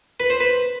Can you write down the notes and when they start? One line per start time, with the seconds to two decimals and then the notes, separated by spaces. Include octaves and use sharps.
0.20 B4
0.30 C5
0.40 B4